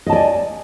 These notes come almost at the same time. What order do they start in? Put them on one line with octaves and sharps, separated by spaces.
D#5 A5 D5 G#5